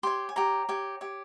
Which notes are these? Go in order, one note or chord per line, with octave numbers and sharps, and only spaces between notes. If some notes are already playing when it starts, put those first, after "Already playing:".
G4 C#5 C6
G#5
G4 C#5 A#5
G4 C#5
G4 C#5